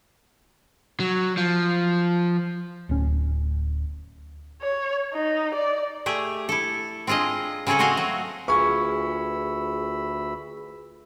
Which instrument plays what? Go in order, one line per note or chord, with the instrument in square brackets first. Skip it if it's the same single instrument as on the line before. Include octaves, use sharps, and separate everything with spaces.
[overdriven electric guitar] F#3
F3
[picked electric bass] D1 C#4
[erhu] C#5
D#4
D5
[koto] A3 G4 G#4
E4 A4
C4 D4 F4 G#4 D#5
C#3 C4 C#4 G#4 A4
A3 C4 F#4 D#5 F5 G#5
F#3
[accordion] D2 B5 E6 [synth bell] F4 G#4 B4 [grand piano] C#6